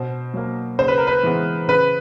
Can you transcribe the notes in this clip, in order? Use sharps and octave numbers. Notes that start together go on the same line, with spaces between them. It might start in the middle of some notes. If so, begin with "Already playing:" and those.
Already playing: B2 C5
F#3 A#3
C#3 C5
B4
A#4
B4
E3 G#3 B3
C#3 B4